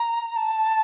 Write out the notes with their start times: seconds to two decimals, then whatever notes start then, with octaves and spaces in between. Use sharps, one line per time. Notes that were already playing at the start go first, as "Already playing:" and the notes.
Already playing: A#5
0.36 A5